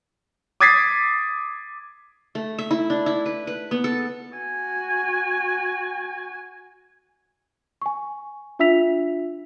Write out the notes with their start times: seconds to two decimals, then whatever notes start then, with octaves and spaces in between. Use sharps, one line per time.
0.60 D6 D#6 G#6 A6 B6 C7
2.35 A3
2.59 E5
2.71 E4
2.90 D4
3.06 E4
3.26 B4
3.47 B4
3.71 B3
3.84 A4
4.35 F#4 G#5
7.82 G#5 C#6
8.59 D4 F4 E5 E6 B6 F7